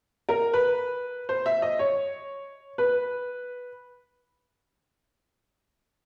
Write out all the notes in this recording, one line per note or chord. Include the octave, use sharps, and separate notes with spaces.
A#4
B4
C5
E5
D#5
C#5
B4